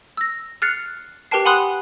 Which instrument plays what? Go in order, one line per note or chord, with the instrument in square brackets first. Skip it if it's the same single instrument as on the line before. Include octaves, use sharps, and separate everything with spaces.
[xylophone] E6 A#6
F6 F#6 A6 C7 C#7 F7
G4 A#4 B4 G5 A5 C7
F#5 G#5 B5 C6 D#6 F#6